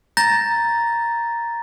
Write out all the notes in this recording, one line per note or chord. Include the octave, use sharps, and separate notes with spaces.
A#5 G6 A6 A#6